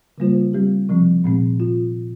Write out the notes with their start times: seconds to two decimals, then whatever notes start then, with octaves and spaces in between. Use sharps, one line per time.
0.18 C#3 G3 A#3 F4 C5
0.53 G3 C4 G4
0.89 C3 F3 C4
1.24 A#2 G#3 C4
1.60 F4